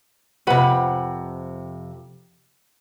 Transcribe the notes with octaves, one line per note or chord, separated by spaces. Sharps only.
F2 C3 B4 F#5 B5